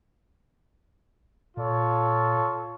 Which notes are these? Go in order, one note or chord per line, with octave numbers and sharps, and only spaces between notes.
A#2 F4 A4 C#5